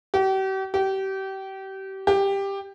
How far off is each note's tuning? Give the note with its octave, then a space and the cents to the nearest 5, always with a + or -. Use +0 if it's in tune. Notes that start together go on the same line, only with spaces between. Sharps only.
G4 -40
G4 -30
G4 +10